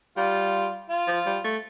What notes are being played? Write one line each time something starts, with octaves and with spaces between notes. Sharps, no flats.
G3 F4
F4
F3
G3
A3